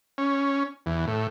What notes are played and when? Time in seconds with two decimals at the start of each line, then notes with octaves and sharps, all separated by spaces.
0.18 C#4
0.86 E2
1.08 A2